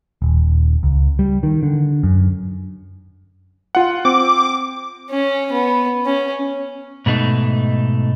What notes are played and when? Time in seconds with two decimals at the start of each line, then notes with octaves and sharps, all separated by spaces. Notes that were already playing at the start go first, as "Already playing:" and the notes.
0.22 D#1
0.83 C#2
1.19 G3
1.43 D#3
1.63 D3
2.03 F#2
3.75 F4 F#5
4.05 C4 D6
5.10 C#4
5.52 B3
6.05 C#4
7.06 G#2 B2 A3 D#4